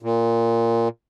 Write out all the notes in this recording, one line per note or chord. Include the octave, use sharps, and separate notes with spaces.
A#2